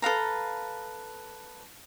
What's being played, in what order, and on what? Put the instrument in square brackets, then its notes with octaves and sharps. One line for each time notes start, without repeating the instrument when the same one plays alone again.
[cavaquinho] A4 B4 F5 A#5